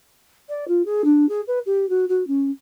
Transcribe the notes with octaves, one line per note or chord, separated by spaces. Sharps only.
D5
F4
G#4
D4
G#4
B4
G4
F#4
F#4
C#4